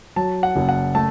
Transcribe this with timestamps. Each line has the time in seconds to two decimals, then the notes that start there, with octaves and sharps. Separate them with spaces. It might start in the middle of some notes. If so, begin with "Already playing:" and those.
0.16 F#3 A5
0.43 F#5
0.56 F#1
0.69 F#5
0.95 A3 A5